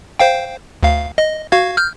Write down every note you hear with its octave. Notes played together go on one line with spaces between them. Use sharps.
C5 F5 G5
D2 F5
D#5
F#4 F5 G#6
F6 G6